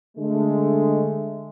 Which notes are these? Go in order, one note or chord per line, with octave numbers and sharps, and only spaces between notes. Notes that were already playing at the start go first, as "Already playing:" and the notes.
D3 G#3 A3